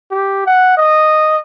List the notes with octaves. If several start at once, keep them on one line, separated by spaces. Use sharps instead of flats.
G4
F#5
D#5